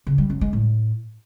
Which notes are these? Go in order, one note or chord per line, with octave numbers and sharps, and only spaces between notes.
C#3
G3
F#2
G#3
A2